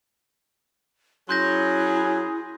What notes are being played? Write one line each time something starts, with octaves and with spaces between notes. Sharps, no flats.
F#3 C#4 E4 G#4 C6 G6 A#6